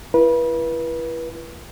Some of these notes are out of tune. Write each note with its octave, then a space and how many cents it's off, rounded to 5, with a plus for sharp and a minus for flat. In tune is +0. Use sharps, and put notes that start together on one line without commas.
E4 +35 B4 -30